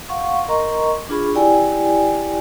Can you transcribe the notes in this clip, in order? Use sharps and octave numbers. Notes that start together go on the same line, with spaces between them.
F5 F#5 C6 C#6
A#4 D#5 A#5 C6 C#6
D4 F4 G#4 B5 C#6
E4 G4 D5 G5 G#5